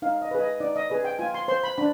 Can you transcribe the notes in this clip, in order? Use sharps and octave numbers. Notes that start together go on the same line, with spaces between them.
D#4 F5
D#5
G#4 B4
D#5
D#4 D5
D#5
G#4 B4
G5
F4 G#5
C6
C5 C6
B5
D4 B5